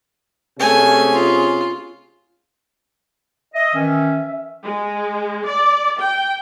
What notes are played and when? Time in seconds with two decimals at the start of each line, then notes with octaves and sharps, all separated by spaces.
0.59 C3 A3 C#4 G#4 G#5
1.13 F4
3.54 D#5 E5
3.75 D#3 E3 C#4
4.63 G#3
5.47 D5
5.99 G5